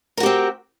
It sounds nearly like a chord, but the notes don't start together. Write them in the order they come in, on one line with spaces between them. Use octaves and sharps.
A#4 F#4 G4 C4